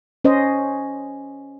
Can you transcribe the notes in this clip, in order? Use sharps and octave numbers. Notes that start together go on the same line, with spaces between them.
C#4 C5 D#5